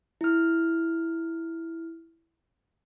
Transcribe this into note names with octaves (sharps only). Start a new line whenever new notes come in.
E4 F6